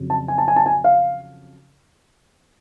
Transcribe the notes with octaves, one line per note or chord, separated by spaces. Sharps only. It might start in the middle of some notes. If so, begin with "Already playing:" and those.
Already playing: F2 C#3 F#3
A5
G#5
A5
G#5
A5
G#5
F5